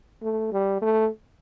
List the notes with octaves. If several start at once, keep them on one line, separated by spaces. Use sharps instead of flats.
A3
G3
A3